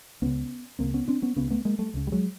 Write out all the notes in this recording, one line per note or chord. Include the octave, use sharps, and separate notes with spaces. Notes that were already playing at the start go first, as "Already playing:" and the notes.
C#2 C#3 B3 C#4
C#2 C#3 A#3 C4
B3 C#4
C4 D4
B3 C#4
C#2 C#3 B3 C#4
A3 B3
G#3 A#3
G3 A3
C#2 C#3
G3
F#3 G#3